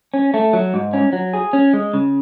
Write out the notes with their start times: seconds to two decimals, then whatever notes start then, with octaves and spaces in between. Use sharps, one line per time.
0.14 C#4
0.34 A3
0.53 F#3
0.74 G#2
0.93 C#4
1.13 F#3
1.34 G#4
1.53 C#4
1.73 G#3
1.94 C#3